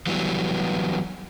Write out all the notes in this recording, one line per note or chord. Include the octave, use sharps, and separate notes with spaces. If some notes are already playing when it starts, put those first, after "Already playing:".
E3 F#3 G3 B3